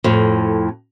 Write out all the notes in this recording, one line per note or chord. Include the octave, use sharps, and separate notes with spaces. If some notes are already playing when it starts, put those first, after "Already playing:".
F2 A2